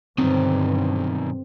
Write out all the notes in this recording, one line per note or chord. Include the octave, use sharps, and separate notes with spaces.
B1 G2 D3 D#3 C4